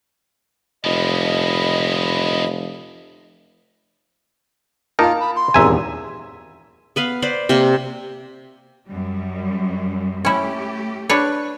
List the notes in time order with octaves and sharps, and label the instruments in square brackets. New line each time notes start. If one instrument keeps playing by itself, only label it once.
[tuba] F1 [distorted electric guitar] D3 F3 [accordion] D#5 B5
[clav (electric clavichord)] A#3 D#4 A#4 [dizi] F4 [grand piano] F5 A5
[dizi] B5
C6
[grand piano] D#1 E2 A#5 [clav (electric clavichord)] G#1 E5 G#5
[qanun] B3 B4 F5
B4 C5 D5
C3 A#3
[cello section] F#2 G3
[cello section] A3 G4 [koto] C#4 E4
[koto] D4 B4 C#5